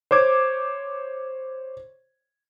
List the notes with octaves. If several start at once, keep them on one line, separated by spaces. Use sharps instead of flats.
C5 C#5 D6 G#6